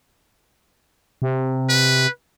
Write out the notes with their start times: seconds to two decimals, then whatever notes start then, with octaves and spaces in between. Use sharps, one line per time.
1.22 C3
1.69 B4